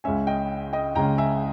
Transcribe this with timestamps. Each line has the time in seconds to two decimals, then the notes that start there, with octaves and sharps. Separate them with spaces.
0.04 C#2 C#3 G#3 C#4 E5 G#5
0.27 D#5 G5
0.73 D#5 G5
0.95 C#2 C#3 G#3 C#4 G5 A#5
1.18 E5 G#5